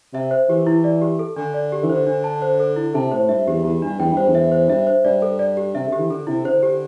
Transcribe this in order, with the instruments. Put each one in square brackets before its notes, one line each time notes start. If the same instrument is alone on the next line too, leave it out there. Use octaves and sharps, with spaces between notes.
[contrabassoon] C3 [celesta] E5
[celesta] C5
[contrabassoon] E3 [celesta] G4
[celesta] E4
D5
G4
A4
[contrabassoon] D3 [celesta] D4
[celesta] D5
G4
[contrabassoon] E3
[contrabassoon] D3 [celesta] C5
[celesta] D4
A5
C5
A4
E4
[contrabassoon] C3 [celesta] A5
[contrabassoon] A2 [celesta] C5
[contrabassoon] G2 [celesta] E5
[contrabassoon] E2 [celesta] G4
[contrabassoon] E2 [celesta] G4
[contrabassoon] G2 [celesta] D4
[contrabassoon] E2 [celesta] G5
[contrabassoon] G2 [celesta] C5
[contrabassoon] E2
[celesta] E5
C5
[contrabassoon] G2 [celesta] E5
[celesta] C5
[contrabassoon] G2 [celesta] D5
[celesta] A4
D5
G4
[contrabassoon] C3 [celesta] E5
[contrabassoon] D3
[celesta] G4
[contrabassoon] E3
[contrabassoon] D3 [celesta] A4
[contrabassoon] C3 [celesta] E4
[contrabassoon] D3 [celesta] C5
[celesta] G4